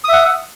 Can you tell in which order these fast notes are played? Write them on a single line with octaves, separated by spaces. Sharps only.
D#6 E5 F#5